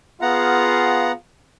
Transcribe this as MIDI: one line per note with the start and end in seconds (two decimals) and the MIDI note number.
0.22 1.12 59
0.22 1.14 65
0.22 1.14 68
0.22 1.14 77
0.22 1.12 78
0.22 1.12 82